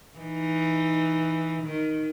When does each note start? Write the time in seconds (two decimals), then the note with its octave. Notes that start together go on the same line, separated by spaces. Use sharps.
0.18 E3 D#4
1.62 D#3